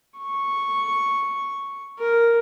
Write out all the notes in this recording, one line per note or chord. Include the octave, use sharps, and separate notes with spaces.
C#6
A#4